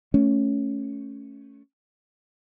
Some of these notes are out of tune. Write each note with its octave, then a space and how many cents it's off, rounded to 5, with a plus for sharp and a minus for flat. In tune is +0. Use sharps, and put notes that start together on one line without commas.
A3 +0 C#4 +0